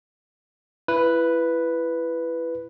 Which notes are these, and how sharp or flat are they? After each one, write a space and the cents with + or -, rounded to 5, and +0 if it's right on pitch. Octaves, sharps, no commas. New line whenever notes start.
E4 +25 B4 +0